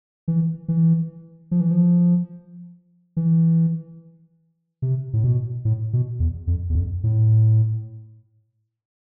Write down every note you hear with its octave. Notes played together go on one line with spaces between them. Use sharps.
E3
E3
F3
E3
F3
E3
C3
A2
B2
A2
B2
E2
F2
E2
F2
A2